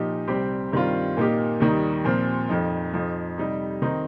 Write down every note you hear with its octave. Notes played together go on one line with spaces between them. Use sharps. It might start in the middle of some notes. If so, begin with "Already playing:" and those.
Already playing: A#2 F3 D#4 G4
C2 C3 G3 C4 G4
G2 D#3 G3 C4 F4
A#2 A#3 D#4 G4
D#2 D#3 G3 D#4
A#2 F3 C4
F2 F3 D#4
F2 F3 D#4
C3 G3 D#4
D#3 C4 D#4